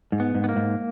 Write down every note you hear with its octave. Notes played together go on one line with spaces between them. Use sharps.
G#2
B3
G#2
B3
A#3
G#2